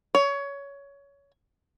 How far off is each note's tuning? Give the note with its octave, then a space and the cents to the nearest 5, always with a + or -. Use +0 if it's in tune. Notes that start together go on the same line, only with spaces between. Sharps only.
C#5 +20